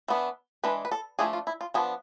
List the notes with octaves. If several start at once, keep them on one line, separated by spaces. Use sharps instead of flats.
E3 B3 D4
E3 G#3 D4 B4
B4
A4
F3 A3 D4 G#4
F4
E4
F4
F3 B3 D4 G#4